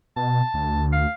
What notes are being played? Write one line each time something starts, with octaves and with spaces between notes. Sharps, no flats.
B2 A5
D2
F5